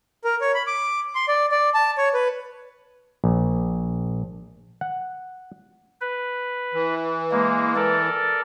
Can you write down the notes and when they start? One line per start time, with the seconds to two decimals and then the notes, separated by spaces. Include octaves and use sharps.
0.24 A#4
0.41 C#5
0.54 B5
0.67 D6
1.15 C6
1.28 D5
1.52 D5
1.74 A5
1.98 C#5
2.14 B4
3.24 A#1
4.81 F#5
6.01 B4
6.74 E3
7.31 G#3 A#3
7.76 A4 A#4 D5